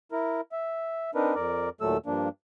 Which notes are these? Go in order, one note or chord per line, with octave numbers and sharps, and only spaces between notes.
E4 A#4
E5
C4 D4 D#4 A#4 B4
F2 A#4 D5
D#2 A#2 F#3 A3 A4 E6
G2 F3 A#3 D4